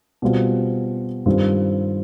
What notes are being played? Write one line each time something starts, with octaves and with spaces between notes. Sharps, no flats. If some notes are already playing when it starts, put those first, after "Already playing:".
B2 G3 C4 F4
G2 D#3 G3 C4 F4